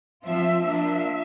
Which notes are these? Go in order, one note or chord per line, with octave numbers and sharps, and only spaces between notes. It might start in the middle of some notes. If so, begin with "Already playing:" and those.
F3 C4 F4 E5
F3 A#3 D4 F4 E5